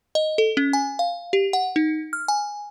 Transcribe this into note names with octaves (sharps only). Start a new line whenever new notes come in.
D#5
A4
C#4
G#5
F5
G4
F#5
D#4
F6
G#5